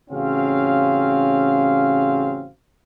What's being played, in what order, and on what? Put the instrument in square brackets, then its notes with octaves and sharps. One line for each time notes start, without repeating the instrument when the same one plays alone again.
[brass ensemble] A1 C#3 C4 C#4 F#4 F5